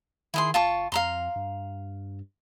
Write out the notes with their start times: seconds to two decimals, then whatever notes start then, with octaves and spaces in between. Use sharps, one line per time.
0.34 D#3 E4 G#4 C6
0.54 F#1 F4 A5 C#6
0.92 F2 F5 A#5 C6
1.36 G2